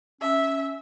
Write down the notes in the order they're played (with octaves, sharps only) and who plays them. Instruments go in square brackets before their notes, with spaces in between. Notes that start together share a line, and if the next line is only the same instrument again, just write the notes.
[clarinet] C#4 [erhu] E5